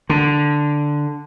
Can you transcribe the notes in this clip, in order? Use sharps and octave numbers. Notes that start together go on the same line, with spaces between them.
D3